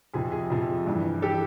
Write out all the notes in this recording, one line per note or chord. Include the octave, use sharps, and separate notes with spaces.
F2 C3 F3 G#4
G#4
F2 C3 F3 G#4
G2 E3
E3 G4 A4